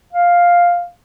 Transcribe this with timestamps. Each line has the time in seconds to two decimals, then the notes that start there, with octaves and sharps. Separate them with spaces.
0.13 F5